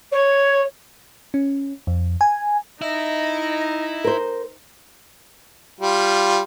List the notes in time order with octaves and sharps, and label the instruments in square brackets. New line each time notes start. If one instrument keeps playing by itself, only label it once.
[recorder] C#5
[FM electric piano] C#4
F2
G#5
[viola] D#4 [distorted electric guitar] E4 E5 [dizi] D#5
[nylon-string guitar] A#4 C5
[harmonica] G3 F4